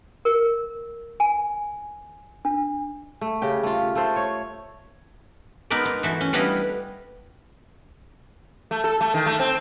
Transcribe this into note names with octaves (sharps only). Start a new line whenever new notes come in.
A#4
G#5
D4
A3
C#3 G4 G5
A3 F4
A3 A4 C5
C#5
G#3 B3 D#4 A#4 B4 D5
D#4
E3 A3 F#4
C#4
G3 B3 D4 E4 D#5 F5
A3
A4
A3
D#3
A3
C4